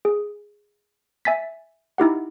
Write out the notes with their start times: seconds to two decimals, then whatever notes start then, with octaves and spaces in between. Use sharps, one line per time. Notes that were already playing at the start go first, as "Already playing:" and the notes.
0.05 G#4
1.25 E5 G#5 A6 B6
1.98 D#4 E4 G4 F#5